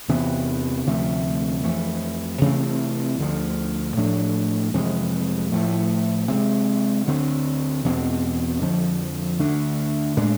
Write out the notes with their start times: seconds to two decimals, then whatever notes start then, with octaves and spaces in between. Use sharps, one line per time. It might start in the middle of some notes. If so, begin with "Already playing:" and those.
0.08 E2 C3 E3 B3
0.86 D2 C3 F3 A3
1.64 F2 E3 A3
2.41 C3 E3 A3 C4
3.19 D2 D3 F3
3.97 A2 F3 A3 D4
4.74 F2 C3 E3 G#3
5.52 A2 F3 A3
6.29 C3 G#3 C4
7.07 D2 D3 G#3 C4
7.85 E2 B2 A3 C4
8.61 F2 D3 F3
9.39 D2 D3 A3 D4
10.17 A2 G#3 D4